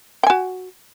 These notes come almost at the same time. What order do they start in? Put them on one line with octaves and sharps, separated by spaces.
G5 G#5 F#4